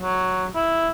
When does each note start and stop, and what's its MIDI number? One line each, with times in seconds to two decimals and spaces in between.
0.01 0.46 54
0.55 0.89 64